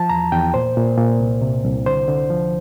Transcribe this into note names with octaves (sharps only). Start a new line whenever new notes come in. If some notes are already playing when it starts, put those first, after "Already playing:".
Already playing: F3 A5
E2 A#5
E2 G5
A#2 C5
A#2
A#2
C2
C3
C2
D3 C5
D3
F3